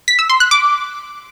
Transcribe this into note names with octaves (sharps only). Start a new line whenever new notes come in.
B6
E6
C6
F#6
D6